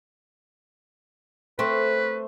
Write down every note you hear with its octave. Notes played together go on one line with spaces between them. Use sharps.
A3 C4 B4 C5